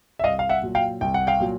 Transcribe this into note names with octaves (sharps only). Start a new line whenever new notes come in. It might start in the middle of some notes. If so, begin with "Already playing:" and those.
E5
C2 D#5 F5
F5
E5 F#5
A#2 F#3
F5 G5
C2 G5
F#5
F5 G5
A#2 F#3